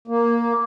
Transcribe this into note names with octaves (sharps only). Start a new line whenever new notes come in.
A#3